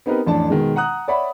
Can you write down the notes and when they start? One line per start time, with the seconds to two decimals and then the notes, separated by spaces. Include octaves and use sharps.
0.06 B3 C4 D#4 G4 A#4 B4
0.27 A1 F2 D4 A5
0.50 B2 D#3 G#3
0.76 F#5 A#5 D#6 F#6
1.08 C#5 D5 E5 F#5 B5